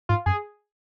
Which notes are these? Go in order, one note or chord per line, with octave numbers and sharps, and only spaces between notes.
G#2 F4
F#2 G#4